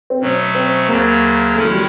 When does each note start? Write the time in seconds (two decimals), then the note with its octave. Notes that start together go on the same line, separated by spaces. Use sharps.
0.10 C4
0.21 B2 F#3 A3 C#4
0.55 C4
0.88 D2 C#3 F#3 A#3
1.55 D#3 G#3 A3 C#4 E4
1.64 F#3
1.73 G3